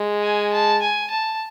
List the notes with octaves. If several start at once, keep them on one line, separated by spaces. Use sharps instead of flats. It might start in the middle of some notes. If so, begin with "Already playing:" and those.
Already playing: G#3
G#5
A5
G#5
A5